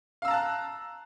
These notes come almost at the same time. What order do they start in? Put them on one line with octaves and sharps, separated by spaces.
F5 E6 A#5 A5 F#6